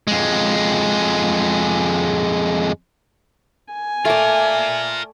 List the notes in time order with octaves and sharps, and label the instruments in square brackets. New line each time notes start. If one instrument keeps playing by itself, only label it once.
[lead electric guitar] F2 G#3
[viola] G#5
[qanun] A3 D5 [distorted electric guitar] F4 A#4